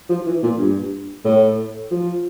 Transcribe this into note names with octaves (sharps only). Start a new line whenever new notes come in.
F3
E3
A#2
G2
A2
F3